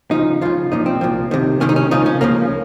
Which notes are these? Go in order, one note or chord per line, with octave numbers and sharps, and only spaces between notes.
C#2 C#3 F3 D#4
C#2 C#3 F3 F4
C2 A#2 F3 D#4
C4
C2 A#2 F3
C2 C3 D#3
C2 C3 D#3 C#4
D#4
C#4
C#2 C#3 F3 D#4
C#4
C#2 C#3 F3 A#3